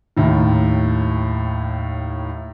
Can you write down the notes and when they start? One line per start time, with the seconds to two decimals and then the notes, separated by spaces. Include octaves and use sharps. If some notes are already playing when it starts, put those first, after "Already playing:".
0.17 D#2 A2 D#3